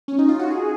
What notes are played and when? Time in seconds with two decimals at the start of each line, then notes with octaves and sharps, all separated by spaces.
0.08 C#4
0.19 D#4
0.28 F4
0.39 F#4
0.50 G#4